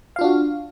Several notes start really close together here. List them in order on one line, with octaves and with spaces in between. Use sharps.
F5 F4 D4 F#4